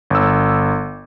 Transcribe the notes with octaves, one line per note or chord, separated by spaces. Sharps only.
G1 E6